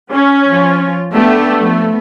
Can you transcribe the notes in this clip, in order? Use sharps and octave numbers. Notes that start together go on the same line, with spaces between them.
C#4
F3 F4
A3 B3 D4 G4
F3 B3